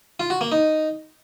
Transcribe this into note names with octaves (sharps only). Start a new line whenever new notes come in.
F4
F#4
A#3
D#4